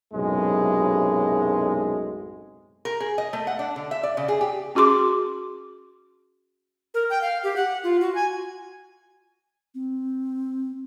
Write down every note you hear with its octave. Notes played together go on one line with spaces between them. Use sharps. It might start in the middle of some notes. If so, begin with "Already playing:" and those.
B1 F#2 A2 C3 G#3
A#4
G#4
D#5
A3
F#5
D4
D3
E5
D5
C#3
G#4
G4
C#4 F#4 G#4 C6 D6
A#4
G5
F5
G4
F#5
F4
F#4
G#5
C4